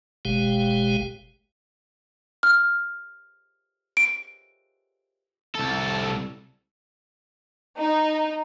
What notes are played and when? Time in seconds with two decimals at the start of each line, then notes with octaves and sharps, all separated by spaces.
0.25 F#1 B2 G#3 G4 F5 G5
2.43 F6
3.97 D7
5.55 C2 A4
7.77 D#4